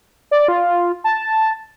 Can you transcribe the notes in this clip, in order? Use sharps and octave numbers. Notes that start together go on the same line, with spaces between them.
D5
F4
A5